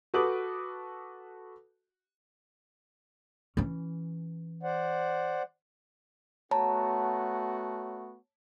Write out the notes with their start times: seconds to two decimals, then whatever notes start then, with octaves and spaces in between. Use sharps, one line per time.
0.14 F#4 A4 B4 D6 D#6 F#7
3.57 E3 C#4
4.63 C5 D5 F#5
6.51 A3 B3 F#4 C#5 A5 A#5